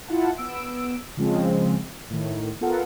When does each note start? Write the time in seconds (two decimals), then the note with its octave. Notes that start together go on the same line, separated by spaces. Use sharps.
0.08 E4 F4 F#5 A5
0.37 B3 E6 D7
1.17 C#3 F3 G#3 C4
2.10 A2 D#3
2.61 B3 F4 A4 A#4 F#5